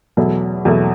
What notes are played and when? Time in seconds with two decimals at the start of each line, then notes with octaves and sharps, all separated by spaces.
0.17 E2 B2 F#3 A3
0.65 E2 B2 F#3 A3